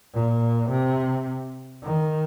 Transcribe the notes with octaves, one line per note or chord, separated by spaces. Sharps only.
A#2
C3
D#3